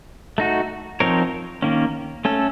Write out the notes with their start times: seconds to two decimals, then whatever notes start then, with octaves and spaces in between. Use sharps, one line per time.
0.38 A3 D#4 F#4
1.00 F3 C4 D#4 A#4 C#5
1.62 D#3 A#3 C#4
2.25 A3 C#4 A4